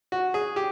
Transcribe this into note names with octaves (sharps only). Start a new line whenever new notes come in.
F#4
G#4
G4